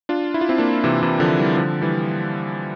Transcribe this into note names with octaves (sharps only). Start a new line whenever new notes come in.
D4 F4
E4
F4
C4 E4
A#3 D4
C3 E3
C3 E3
D3 F3
E3 G3
D3 F3
E3 G3